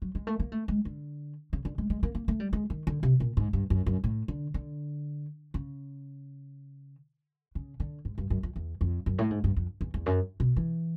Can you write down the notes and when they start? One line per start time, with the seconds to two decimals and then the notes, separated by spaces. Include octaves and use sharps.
0.02 F#3
0.15 G#3
0.27 A3
0.40 A#3
0.52 A3
0.68 G#3
0.85 D3
1.53 C#3
1.65 D3
1.78 G#3
1.90 G#3
2.03 A#3
2.15 A#3
2.28 A3
2.40 G3
2.53 G#3
2.70 D#3
2.87 D3
3.03 C3
3.20 A#2
3.37 G#2
3.53 G2
3.70 F#2
3.86 F#2
4.04 A2
4.28 D3
4.54 D3
5.54 C#3
7.55 C#3
7.80 D3
8.05 G#2
8.18 G2
8.30 F#2
8.43 F2
8.56 E2
8.81 F2
9.06 F#2
9.18 A2
9.30 G#2
9.44 G2
9.56 F2
9.81 E2
9.94 E2
10.06 F#2
10.40 B2
10.56 E3